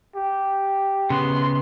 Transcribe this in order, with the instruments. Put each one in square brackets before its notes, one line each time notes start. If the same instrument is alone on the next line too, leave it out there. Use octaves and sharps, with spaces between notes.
[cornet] G4
[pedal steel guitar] C#3 B3 [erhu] C6